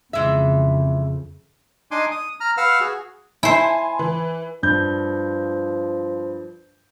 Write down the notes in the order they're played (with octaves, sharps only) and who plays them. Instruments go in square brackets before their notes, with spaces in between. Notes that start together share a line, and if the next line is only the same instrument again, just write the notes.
[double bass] F2 C#3 [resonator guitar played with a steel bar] E3 G#3 E5
[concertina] D4 D#4 G#5 C6 D6
D#6
A#5 F6
B4 F5 F#5 E6 F6
F#4 G#4
[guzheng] E4 C5 [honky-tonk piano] G#5 A5 C6
[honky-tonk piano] E3
[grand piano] G2 G6 [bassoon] F3